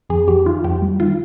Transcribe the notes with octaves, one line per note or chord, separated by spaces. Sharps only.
F2 G#4
F2 G4
D#3 F4
F2 G4
G3
D#3 F4